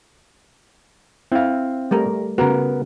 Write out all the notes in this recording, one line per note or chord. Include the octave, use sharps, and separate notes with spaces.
C4 E4 F5
G3 A3 A#4
C#3 B3 F#4 A#4 A#5